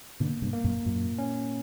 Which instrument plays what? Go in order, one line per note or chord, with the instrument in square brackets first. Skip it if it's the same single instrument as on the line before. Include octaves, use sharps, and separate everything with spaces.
[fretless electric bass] B2 D3 [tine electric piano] A#3
[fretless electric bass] G2 B2
[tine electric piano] A#3
[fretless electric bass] F#2 A#2
[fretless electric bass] F#2 [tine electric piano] A#2
[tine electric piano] C#4